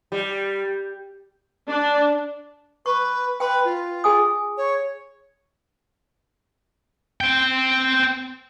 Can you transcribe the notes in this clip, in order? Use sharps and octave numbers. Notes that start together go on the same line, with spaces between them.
G3
D4
B4 C#6
B4 G5 C6
F4
G#4 G#5 D#6
C#5
C4 G5